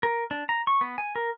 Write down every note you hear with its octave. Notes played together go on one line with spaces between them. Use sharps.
A#4
D4
A#5
C#6
B3
G#5
A#4